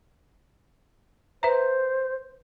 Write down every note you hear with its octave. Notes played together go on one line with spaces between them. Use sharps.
B4 C5 E5 A#5